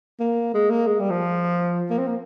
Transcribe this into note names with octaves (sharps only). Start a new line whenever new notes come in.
A#3
G#3
A#3
G#3
G3
F3
A#3
C4
A#3